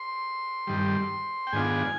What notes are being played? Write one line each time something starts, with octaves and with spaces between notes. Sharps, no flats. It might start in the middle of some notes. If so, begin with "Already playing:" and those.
Already playing: C6
G2 D#3 G3
G5
G#2 D#3 B3 D4 F4 G#5